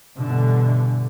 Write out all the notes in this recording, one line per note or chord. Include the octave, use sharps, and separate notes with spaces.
G2 B2 D3 E3